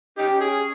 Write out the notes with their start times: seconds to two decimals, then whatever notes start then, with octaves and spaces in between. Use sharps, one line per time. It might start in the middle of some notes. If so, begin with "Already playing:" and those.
0.18 C#4 D#4 G4
0.41 G#4